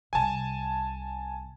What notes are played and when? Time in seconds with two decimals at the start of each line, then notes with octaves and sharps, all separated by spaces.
0.13 C2 C3 G#5 A5